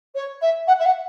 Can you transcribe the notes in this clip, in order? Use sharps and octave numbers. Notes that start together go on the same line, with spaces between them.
C#5
E5
F#5
E5
F#5